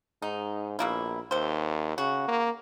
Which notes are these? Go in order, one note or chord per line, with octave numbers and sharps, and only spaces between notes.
G#2 D#4
A#1 B2 A#3 E4
D#2 C3 C5
C#3 F#4
A#3